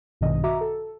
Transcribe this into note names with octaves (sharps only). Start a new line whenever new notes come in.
A#1 G2 B2 D#3 D#5
F#4 E5 A#5 D6
A4